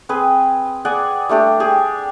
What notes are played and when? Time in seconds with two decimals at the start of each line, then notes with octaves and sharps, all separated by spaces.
0.09 C4 G#4 B4
0.85 G#4 D5 F#5 G#5
1.29 G3 A3 D4 G4
1.60 G4 G#4